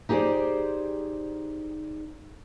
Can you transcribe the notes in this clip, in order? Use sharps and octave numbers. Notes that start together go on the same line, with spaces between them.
D#4 G4 G#4 B4 C5 D5